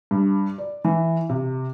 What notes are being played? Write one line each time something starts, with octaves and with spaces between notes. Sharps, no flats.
G2
D5
E3
C3